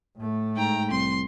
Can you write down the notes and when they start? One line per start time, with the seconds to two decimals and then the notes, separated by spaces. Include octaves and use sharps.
0.17 A2 A3
0.56 G#2 G5 A#5
0.91 C2 C6